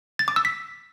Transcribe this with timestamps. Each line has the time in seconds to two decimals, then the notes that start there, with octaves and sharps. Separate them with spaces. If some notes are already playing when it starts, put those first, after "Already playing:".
0.19 A6
0.28 D6
0.36 E6
0.45 B6